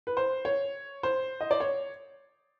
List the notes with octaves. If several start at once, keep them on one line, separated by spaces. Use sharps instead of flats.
B4
C5
C#5
C5
D#5
D5
C#5